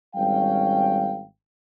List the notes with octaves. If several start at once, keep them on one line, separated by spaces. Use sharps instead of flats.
G#1 G3 C#4 F5 G5